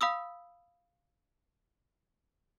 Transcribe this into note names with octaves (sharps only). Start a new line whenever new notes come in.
F5 B5 D#6 E6